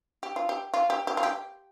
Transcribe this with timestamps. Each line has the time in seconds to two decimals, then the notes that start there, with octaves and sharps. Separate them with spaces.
0.23 G4
0.36 F4
0.49 G4
0.74 F4
0.90 G4
1.07 G4
1.17 F4
1.23 G4